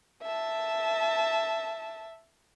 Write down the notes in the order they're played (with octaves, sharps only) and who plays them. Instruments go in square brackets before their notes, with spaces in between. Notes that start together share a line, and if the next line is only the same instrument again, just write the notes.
[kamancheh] E5 A5